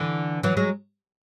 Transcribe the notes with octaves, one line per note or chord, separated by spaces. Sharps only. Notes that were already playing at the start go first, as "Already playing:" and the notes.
Already playing: D3 E3
E3 F#3
F#3 G#3